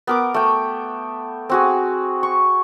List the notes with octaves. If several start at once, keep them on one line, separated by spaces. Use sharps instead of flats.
B3 A#4 D6
A3 G5
C4 F#4 G#4
C#6